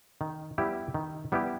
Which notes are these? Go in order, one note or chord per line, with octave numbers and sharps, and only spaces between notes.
D#3
G3 B3 E4 G4
D#3
G3 B3 E4 G4